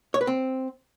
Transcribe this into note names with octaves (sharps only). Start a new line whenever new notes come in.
C#5
B4
C4